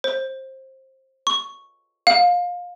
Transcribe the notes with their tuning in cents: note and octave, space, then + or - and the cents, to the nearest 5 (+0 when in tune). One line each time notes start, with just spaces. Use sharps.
C5 +20
C#6 +0
F5 +25